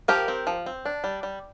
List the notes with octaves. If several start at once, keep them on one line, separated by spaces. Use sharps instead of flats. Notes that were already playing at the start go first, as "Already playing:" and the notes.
F3 G4 A#4
C4
F3
C4
D4
G3
G3